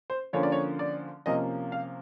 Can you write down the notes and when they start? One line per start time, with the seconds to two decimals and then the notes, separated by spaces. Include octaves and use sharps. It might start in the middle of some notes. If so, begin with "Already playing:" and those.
0.10 C5
0.33 D3 F3 A#3 C#4 C#5
0.43 D5
0.52 C#5
0.79 D5
1.26 C3 F3 A#3 C#4 D#5
1.72 F5